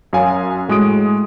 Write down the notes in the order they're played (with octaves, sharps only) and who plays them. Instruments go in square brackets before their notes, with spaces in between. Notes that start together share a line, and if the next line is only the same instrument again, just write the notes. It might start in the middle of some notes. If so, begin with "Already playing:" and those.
[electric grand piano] F#2 C#5 F5 G#5
A2 G#3 F#4 D#6 D7